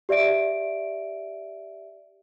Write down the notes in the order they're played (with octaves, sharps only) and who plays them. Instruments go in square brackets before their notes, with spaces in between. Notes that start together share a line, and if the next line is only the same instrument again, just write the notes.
[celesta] G4 D5 E5 D7